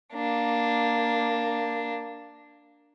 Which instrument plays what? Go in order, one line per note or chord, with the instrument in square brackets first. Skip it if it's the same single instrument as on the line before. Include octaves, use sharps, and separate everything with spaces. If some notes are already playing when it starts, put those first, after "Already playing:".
[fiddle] A#3 D4